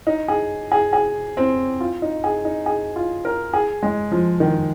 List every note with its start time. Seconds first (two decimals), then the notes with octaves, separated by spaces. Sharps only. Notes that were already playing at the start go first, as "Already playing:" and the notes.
0.07 D#4
0.28 G#4
0.72 G#4
0.93 G#4
1.37 C4
1.80 F4
2.02 D#4
2.24 G#4
2.45 D#4
2.66 G#4
2.96 F4
3.25 A#4
3.53 G#4
3.83 G#3
4.12 F3
4.40 D#3